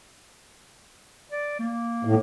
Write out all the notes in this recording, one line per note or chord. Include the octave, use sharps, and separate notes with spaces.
D5
A#3
A2